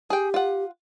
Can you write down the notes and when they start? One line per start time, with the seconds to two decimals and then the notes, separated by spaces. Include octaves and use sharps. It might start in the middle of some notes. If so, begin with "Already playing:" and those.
0.10 G4 G#4 G5
0.34 F4 F#5